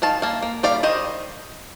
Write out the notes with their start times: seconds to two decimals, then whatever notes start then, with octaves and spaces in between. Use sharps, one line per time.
0.02 D#3 F5 A5
0.22 A#3 F5 A5
0.43 A#3
0.63 G3 D5 F5
0.83 D#3 C5 D#5